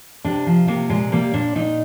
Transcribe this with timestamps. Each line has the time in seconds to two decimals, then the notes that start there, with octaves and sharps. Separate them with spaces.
0.25 C3 D4
0.46 F3
0.68 C3 A#3
0.90 A#2 G#3
1.12 G3 A#3
1.33 A#2 D4
1.55 A#2 D#4